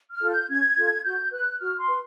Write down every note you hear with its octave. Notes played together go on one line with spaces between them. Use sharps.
F6
F4 A4
G6
C#4 G#6
F4 A4
F#4 G6
B4 F#6
F#4 F6
C6
B4